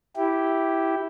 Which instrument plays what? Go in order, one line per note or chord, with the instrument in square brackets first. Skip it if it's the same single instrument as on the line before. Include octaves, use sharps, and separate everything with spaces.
[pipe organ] E4 G4